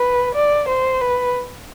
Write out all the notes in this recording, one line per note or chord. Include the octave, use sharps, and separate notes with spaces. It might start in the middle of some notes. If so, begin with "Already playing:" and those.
Already playing: B4
D5
C5
B4